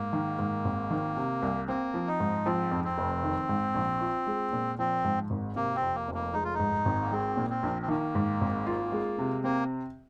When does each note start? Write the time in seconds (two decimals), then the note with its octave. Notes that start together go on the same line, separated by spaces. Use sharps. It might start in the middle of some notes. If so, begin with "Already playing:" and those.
Already playing: G#2 A#3
0.13 D#3
0.39 G#2
0.65 G#1
0.90 D#3
1.17 C3
1.42 C2
1.68 A#3 C4
1.94 F3
2.07 D#4
2.20 G#2
2.45 F3 C4
2.71 F2
2.84 C4
2.98 F1
3.23 D#3
3.49 G#2
3.75 A#1
4.01 F4
4.27 G#3
4.53 A#2
4.79 F3 C4
5.04 G#2
5.30 G#1
5.56 C3 A#3
5.76 C4
5.82 F2
5.95 A#3
6.08 F1
6.14 A#3
6.33 G#3 D#4
6.44 F4
6.54 D#4
6.60 G#2
6.85 G#1
7.02 A#3
7.11 G#3 C4
7.37 A#2
7.50 C4
7.63 A#1
7.82 C4
7.88 D#3 A#3
8.15 G#2
8.41 G#1
8.67 F4
8.92 G#3
9.18 C3
9.44 A#3 C4